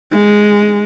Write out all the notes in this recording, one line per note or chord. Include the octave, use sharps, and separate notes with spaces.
G#3